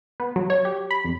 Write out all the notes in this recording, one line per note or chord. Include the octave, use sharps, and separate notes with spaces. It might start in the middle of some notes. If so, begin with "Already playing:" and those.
B3
F#3
C#5
G4
B5
F2